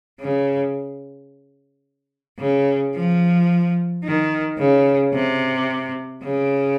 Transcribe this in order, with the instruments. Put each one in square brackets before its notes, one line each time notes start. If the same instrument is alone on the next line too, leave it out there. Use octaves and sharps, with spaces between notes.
[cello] C#3
C#3
F3
D#3
C#3
C3
C#3